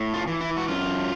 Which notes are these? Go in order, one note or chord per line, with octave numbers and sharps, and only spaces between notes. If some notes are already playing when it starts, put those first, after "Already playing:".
Already playing: A2
F4
E3
E4
F#4
F#2 F4